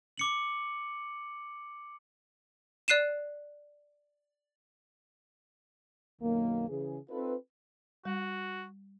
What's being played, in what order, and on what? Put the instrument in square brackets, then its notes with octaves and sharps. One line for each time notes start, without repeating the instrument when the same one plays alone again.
[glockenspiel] D6 C#7 F#7
[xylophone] D5 F#6 C7 D#7 E7
[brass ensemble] B1 F#2 D#3 F#3 A#3
C#3 E3 G#4
C4 D#4 F4 A4 B4
[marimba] G3 [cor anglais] F#4